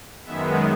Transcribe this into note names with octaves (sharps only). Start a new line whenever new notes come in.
F#2 D#3 G#3 B3 E5